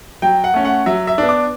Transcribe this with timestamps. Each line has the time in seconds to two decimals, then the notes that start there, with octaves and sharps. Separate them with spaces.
0.22 F#3 G5
0.44 F#5
0.54 A3 C#4
0.65 F#5
0.86 F#3 E5
1.07 E5
1.18 B3 D4
1.29 D6